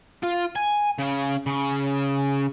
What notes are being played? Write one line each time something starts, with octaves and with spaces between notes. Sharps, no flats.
F4
G#5
C#3
C#3